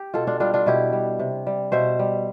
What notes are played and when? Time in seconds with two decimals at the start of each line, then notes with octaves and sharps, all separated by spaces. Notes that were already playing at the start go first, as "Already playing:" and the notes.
Already playing: G4
0.14 B2 F4 A4
0.27 D4 F4
0.40 G3 D4 F4
0.54 D4 F4
0.66 B2 E4 G4
0.93 G3
1.19 C3
1.47 G3
1.72 B2 C5 E5
1.99 G3